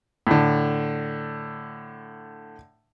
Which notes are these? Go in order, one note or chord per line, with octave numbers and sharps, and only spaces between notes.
A2 D3